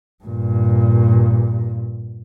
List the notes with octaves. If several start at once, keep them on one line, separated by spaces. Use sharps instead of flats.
G2 A#2